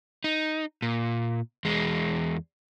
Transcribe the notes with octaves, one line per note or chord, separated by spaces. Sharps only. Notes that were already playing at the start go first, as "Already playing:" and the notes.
D#4
A#2
E2 G#3